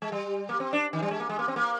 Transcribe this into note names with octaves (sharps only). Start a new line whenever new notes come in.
G#3
G3
A#3
C4
D4
D#3
G3
G#3
A#3
G#3
A#3
C4
A#3